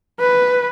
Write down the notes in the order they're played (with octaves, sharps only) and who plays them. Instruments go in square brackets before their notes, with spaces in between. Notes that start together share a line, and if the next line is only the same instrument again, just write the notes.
[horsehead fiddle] B4